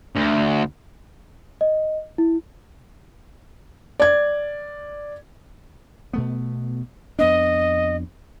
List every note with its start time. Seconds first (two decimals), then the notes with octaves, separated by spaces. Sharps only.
0.16 D2
1.61 D#5
2.18 E4
4.00 D5 G#6
6.13 B2 A3 B3
7.19 F2 B3 D4 D#5